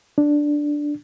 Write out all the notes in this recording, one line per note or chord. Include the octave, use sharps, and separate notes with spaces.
D4